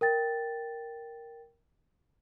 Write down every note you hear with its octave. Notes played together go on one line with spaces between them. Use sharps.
A#4 G5 A6